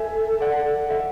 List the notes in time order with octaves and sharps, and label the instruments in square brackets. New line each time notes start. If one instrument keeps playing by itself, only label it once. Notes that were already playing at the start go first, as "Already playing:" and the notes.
Already playing: [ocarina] A4 [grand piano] E5 G#5
[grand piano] D5 F#5
E5